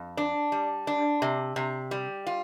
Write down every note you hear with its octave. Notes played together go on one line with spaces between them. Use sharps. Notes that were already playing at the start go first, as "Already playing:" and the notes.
Already playing: F2
D4
G3
D4
C3
C3
G3
F4